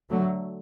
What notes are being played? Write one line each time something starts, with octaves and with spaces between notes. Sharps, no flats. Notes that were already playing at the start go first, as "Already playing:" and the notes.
D3 F#3 A3